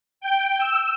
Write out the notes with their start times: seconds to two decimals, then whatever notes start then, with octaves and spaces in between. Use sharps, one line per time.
0.21 G5
0.58 E6